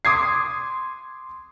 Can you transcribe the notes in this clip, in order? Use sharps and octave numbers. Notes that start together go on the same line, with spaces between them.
C6 D6 D#6 G#6 C7